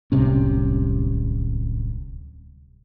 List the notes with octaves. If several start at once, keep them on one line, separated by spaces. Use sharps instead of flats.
D1 C2 C3 C#4